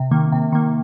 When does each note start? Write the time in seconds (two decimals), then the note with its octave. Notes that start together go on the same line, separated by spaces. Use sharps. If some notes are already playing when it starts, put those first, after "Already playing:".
Already playing: C3
0.11 D#3 A#3
0.32 C3
0.52 D#3 A#3